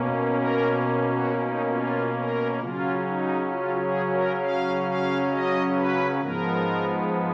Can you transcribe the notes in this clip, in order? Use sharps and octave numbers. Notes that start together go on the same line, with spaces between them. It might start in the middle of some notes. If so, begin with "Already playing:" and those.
Already playing: B2 A#3 C#4
A#4
F#4
D#4
F4
A#4
C#3 F#3 C#4 F4
D#4
F4
G#4
A#4
F5
F5
D#5
B4
G#2 F3 G#3 B3 A#4